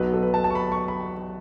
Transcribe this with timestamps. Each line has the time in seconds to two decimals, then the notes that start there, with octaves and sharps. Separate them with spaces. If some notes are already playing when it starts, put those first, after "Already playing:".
Already playing: B1 B2 F#3 B4
0.13 A4
0.23 B4
0.34 A5
0.44 A5
0.50 C#6
0.55 B5
0.72 C#6
0.88 B5